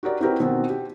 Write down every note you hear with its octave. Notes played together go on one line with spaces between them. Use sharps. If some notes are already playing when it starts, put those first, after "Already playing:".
F#4 G4 A#4 D5
C4 E4 F#4 G4 A#4 B4
B2 D#3 C4
G4